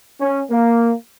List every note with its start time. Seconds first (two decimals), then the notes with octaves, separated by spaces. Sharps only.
0.21 C#4
0.51 A#3